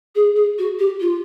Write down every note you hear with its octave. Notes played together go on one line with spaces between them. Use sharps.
G#4
G#4
F#4
G4
F4